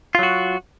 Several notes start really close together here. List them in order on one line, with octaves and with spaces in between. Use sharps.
F4 F#3 F#4